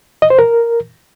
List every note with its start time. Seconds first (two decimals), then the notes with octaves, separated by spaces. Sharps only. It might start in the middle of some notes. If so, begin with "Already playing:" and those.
0.22 D#5
0.30 C5
0.39 A#4